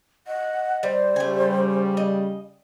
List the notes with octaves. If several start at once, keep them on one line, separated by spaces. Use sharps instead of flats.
D#5 F#5
G3 C5
C#3 G3 A3 C#4 G#5
D#5